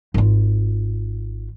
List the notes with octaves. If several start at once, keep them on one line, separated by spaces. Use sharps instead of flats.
G#1 F4